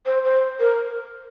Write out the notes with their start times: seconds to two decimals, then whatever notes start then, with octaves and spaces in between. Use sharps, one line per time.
0.06 C5
0.24 C5
0.60 A#4